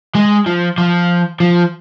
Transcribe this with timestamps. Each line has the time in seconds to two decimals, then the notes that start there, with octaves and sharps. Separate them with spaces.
0.15 G#3
0.46 F3
0.78 F3
1.40 F3